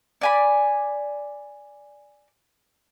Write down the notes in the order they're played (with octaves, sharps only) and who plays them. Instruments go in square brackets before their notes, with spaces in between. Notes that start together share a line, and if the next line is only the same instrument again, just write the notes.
[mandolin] D5 G#5 B5